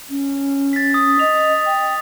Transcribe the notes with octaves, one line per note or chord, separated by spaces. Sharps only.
C#4
A6 B6
D#6
D#5 F7
G5